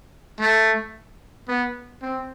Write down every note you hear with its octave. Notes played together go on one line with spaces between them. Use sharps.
A3
B3
C4